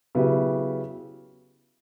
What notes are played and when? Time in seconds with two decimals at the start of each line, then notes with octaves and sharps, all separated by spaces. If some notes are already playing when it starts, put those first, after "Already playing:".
0.15 C#3 F#3 B3 E4 G4